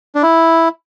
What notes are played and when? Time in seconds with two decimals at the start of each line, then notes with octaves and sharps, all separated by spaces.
0.15 D4
0.23 E4